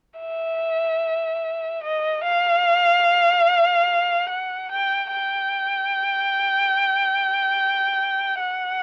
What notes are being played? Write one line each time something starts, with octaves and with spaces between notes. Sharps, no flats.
E5
D#5
F5
F#5
G5
G5
F#5